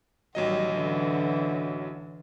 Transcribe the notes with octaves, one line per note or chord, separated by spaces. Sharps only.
A1 D#3 F#3 G3 D#5
D3 E3